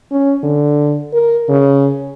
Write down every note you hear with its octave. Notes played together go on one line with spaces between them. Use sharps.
C#4
D3
A#4
C#3